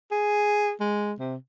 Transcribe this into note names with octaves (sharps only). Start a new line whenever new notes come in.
G#4
G#3
C3